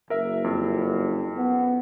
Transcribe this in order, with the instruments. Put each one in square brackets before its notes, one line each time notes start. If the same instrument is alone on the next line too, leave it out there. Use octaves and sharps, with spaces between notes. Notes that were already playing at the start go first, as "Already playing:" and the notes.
[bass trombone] F#1 [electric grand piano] A#4 E5
[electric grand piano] F2
[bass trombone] B3